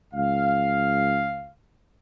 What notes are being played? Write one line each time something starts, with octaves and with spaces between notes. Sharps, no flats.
C#2 F5